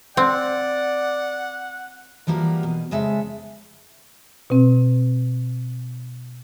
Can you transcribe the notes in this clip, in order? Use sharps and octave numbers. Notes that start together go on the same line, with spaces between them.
C4 D5 F#5
E3 F3 G3 A#3 F#4 A#4
B2
F2 C#3 G#3 A4 E5
B2 C4